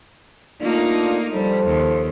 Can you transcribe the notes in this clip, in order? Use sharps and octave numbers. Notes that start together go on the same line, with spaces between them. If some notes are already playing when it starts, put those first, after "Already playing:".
A3 A#3 D4 D#4 F4
F3 G3 A4 C5
D#2